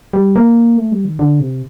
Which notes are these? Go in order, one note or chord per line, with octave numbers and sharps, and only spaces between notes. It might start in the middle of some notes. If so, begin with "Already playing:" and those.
G3
A#3
A3
G3
D#3
D3
C3